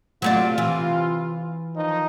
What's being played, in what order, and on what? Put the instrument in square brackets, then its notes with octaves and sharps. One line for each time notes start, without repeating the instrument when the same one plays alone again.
[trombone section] C3 F4 [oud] F#3 A3 D5
[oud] E3
[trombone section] D#3 F3 D#4